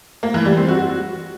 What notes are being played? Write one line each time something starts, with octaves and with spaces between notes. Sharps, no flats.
A#3
E3
G3
C4
F#4